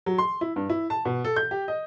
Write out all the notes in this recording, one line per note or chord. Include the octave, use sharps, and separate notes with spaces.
F#3
C6
E4
G2
E4
A5
B2
A4
G6
G4
D#5